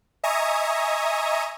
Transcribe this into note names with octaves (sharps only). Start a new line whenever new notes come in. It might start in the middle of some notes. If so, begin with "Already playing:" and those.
D#5 E5 G#5 A#5 C#6 D#6